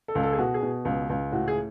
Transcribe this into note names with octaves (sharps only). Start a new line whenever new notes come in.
A4
C#2
A4
G#4
B2 F#4
G#4
B2
C#2
C#2
A2 F#4
G#4